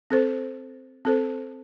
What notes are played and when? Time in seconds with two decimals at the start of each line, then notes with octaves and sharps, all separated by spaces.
0.10 C4 A4 C5
1.05 C4 A4 C5